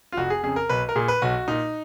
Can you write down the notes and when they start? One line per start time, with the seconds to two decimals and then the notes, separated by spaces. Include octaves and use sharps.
0.12 F4
0.17 F1 F#4
0.30 G#4
0.43 F2 C#3 G#4
0.56 A#4
0.69 B1 B4
0.89 A#4
0.96 A#2 G#4
1.08 B4
1.22 B1 F#4
1.48 A#2 D#4